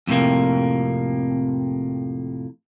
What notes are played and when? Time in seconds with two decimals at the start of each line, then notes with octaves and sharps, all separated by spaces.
0.07 F2 A2 C3 A#3